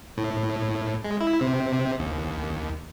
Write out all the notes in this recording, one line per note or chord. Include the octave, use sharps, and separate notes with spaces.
A2
G#3
E4
C3
D#2